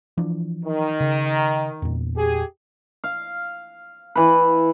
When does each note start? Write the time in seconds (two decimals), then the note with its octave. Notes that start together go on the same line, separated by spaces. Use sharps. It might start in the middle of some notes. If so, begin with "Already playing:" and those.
0.17 E3 F3 D4
0.63 D#3
1.00 C#3
1.82 E2 A#2
2.15 G4 G#4
3.04 F5
4.15 E3 B4